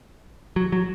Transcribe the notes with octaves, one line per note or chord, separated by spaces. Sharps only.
F#3
F#3